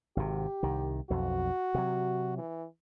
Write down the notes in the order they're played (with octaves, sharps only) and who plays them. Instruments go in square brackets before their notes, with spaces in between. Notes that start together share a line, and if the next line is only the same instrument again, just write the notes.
[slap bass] G#1 C3 [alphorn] G4
[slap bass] C2 D#3
[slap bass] B1 F2 [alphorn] F#4
[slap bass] C3 F#3
[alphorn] E3